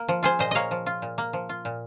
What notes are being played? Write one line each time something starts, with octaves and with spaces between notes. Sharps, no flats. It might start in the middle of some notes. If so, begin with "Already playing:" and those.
Already playing: A#3
F3
F4 G#4 C5
A#2 C5 D#5
A#3 C#5 D#5 F5
F3
F4
A#2
A#3
F3
F4
A#2